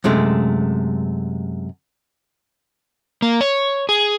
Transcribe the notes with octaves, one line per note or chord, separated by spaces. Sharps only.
F#2 C3 G#3 A3
A#3
C#5
G#4